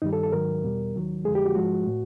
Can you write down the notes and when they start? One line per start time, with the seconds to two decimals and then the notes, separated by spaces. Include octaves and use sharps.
0.02 G2 D#3 G3 D#4
0.13 A4
0.23 A4
0.32 G#2 D#3 F#3 A#4
0.63 E2 B2 G3
0.94 D#2 D#3 F#3
1.24 F2 D3 F3 G#3 G#4
1.35 G4
1.45 F#4
1.55 G#2 F3 G#3 F#4
1.86 A2